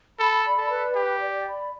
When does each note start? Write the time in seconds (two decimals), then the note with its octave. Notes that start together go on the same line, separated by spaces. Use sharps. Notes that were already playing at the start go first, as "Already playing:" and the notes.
0.19 A4 B5
0.45 D5
0.57 A4
0.70 B4
0.95 G4 G5
1.21 D5
1.46 B5